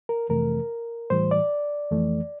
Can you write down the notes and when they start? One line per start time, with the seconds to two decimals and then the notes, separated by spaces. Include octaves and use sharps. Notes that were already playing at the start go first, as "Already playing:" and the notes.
0.09 A#4
0.29 F2 C3 E3 A3 A#4
1.10 A2 E3 G3 C5
1.31 D5
1.91 F2 E3 A3